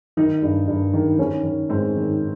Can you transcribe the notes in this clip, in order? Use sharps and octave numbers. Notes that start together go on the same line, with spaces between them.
D#3 D#4
G2
G2
D#3
D#3 C#4
D#3
G#2 C4
D#3